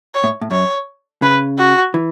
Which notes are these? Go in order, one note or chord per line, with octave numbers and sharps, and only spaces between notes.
C#5
A2
A2
F#2 C#5
C#3 B4
F#4
E3